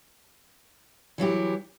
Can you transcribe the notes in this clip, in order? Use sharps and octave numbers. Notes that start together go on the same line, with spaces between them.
E3 F#3 E4 G4